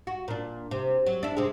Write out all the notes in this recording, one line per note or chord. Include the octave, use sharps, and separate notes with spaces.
F#4
A#2 D4
C3
F#3
D4 E4
C3 G#3